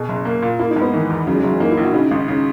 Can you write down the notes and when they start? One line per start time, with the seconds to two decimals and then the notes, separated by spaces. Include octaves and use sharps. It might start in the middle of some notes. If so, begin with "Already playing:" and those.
Already playing: B2 G#4
0.09 F#1
0.25 A#3
0.42 A#2
0.59 A#3 E4
0.71 D#4
0.76 G#2
0.81 B3
0.93 D#3 E3
1.10 E2
1.27 C#3 F#3
1.35 G#3
1.43 F#1 F#3
1.52 E3
1.60 A#3 D#4
1.71 E4
1.77 A#1
1.83 F#4
1.94 C#3 D#4
2.11 G#1
2.28 C#3